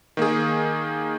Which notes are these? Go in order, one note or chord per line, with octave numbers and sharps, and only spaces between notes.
D#3 A#3 G#4